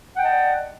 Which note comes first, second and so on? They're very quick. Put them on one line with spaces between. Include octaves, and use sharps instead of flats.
F#5 G5 D#5 A5 D5